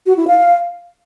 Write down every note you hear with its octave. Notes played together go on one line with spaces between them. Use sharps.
F#4
E4
F5